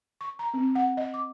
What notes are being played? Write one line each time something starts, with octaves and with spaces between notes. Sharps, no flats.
C#6
A#5
C4
F#5
D#5
D6